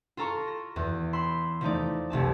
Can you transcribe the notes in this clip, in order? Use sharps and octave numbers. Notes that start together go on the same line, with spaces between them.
F4 A4 A#5 C#6
A#6
E2
B5 C6 E6
F3 A3 D#4 D5
F1 C2 A3 A5